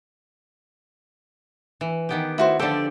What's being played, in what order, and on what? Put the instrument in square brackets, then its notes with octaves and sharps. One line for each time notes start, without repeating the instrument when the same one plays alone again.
[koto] E3
D#3 B3 G4
[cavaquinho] E4 F#4 C5
[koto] D3 F3 G4 [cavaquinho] A4 D5